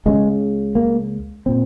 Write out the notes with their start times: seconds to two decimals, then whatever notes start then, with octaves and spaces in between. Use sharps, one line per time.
0.06 C#2 C#3 G#3
0.75 A#3
1.46 A#2 C4